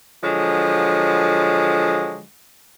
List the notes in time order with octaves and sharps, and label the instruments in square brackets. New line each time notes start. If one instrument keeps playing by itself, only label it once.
[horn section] D3 F3 F#3 G#3